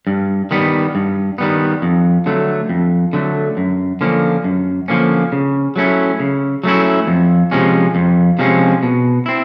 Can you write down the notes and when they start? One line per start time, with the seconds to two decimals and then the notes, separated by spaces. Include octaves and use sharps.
0.07 G2
0.51 D#3 G3 B3
0.95 G2
1.38 D#3 G3 B3
1.82 F2
2.26 D3 F#3 A3
2.69 F2
3.13 D3 F#3 A3
3.57 F#2
4.01 D3 F3 A#3 C#4
4.44 F#2
4.88 D3 F3 A#3 C#4
5.32 C#3
5.76 F#3 A3 C#4 E4
6.20 C#3
6.64 F#3 A3 C#4 E4
7.07 F2
7.51 C3 F3 G#3 C#4
7.95 F2
8.39 C3 F3 G#3 C#4
8.83 B2
9.26 C4 E4